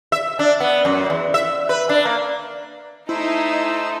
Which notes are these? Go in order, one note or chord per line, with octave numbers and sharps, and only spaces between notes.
E5
D4
B3
F#2
E2
E5
B4
D4
A#3
A3 D#4 E4 C5 E6